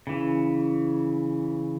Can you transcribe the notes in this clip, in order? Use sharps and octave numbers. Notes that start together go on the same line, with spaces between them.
C#3 E3